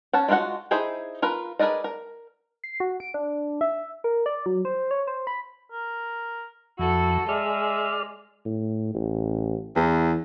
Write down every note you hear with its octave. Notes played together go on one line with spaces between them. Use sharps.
C#4 F#5 A5
G#3 D4 F4 F#4 F#5
D#4 E4 G#4 C5 G#5
F4 A#4 B4
G#4 A#4 B4 D5 D#5
A#4
C7
F#4
D7
D4
E5
A#4
D5
F#3
C5
C#5
C5
B5
A#4
F2 E4 F#4 A4
G#3 G#4 D5 E5 F6
A2
A1
E2 E3